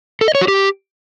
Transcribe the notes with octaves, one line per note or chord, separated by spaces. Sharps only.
A4
D#5
C#5
F#4
G4